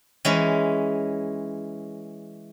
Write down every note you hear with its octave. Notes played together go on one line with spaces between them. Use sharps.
E3 G#3 C#4